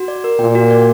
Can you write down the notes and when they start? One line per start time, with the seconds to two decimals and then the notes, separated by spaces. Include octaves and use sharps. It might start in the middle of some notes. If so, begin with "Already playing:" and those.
Already playing: F#4
0.08 D5
0.24 A#4
0.39 A#2 G5
0.55 F#4
0.70 D5